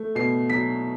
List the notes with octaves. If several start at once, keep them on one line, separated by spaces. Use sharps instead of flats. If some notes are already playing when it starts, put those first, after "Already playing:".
Already playing: A3
B2 C7
F#3 B6